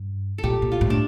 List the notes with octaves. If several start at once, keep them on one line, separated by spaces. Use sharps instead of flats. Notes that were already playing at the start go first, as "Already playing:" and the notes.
Already playing: G2
A4
A#2 G4
A#2
F4
A2
D4